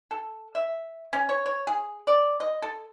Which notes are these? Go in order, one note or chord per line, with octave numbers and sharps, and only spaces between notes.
A4
E5
C#4
C#5
C#5
G#4
D5
D#5
A4